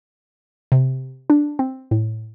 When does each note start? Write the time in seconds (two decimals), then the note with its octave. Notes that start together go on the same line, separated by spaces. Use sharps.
0.72 C3
1.30 D4
1.59 C4
1.91 A2